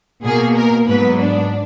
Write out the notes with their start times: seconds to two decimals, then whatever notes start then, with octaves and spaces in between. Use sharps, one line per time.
0.24 B2 A#3 G#4
0.56 A#4
0.87 G#2 F#3 B3 B4
1.19 D4